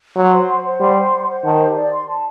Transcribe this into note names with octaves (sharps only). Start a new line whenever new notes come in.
F#3 C6
C5
F#5
C5
G3 C6
C5
F#5
C5
D#3 A5
G4
D5
C6
A5